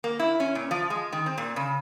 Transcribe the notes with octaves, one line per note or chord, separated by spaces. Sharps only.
A#3
E4
C#4
A#2
F3
G#3
D#3
C4
A#2
C#3